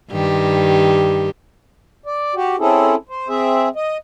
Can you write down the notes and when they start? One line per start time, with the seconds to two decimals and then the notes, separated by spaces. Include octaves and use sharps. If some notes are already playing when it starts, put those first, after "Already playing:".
0.11 G2 D#3 G4
2.06 D5
2.35 F#4 G4
2.59 C4 C#4 E4 G#4 A4
3.09 C5
3.28 C4 G#4 E5
3.76 D#5